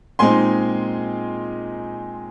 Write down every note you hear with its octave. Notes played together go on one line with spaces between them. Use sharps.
A#2 G#3 C4 D#4 G#5 C6